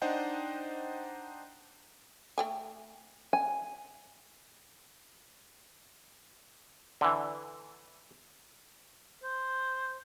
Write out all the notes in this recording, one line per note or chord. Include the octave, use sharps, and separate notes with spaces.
D4 D#4 C5 D#5 F#5 G5
A3 G5 G#5
G#5
D3 E3
C5